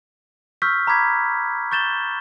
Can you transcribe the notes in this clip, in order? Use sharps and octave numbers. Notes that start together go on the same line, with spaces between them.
C#6 E6 F6 G6 B6
A#5 B5 D6 G#6 B6
C#6 G6 A6 E7 G7